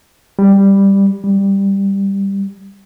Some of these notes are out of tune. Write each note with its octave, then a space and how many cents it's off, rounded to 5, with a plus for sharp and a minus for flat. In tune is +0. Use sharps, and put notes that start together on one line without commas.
G3 +5
G3 +5